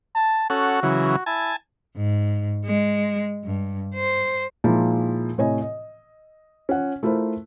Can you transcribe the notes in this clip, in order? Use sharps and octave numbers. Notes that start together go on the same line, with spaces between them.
A5
C#4 F#4 A4 F#5
C#3 E3 F#3
E4 G#5 A5
G#2
G#3
G2
C5
A#2 F3 G#3 A#3 D#4 E4
A2 C3 C#5 D#5 G#5
D#5
C#4 F4 F#5
A3 E4 F4 A#4 C5